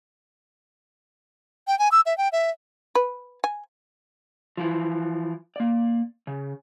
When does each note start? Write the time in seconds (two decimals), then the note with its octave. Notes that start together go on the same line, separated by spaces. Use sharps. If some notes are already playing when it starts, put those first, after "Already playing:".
1.68 G5
1.79 G#5
1.92 E6
2.06 E5
2.18 G5
2.32 E5
2.95 B4
3.44 G#5
4.57 E3 F3
5.56 A#3 D5
6.27 C#3